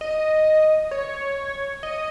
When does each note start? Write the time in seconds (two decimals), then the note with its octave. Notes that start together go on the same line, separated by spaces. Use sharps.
0.01 D#5
0.91 C#5
1.83 D#5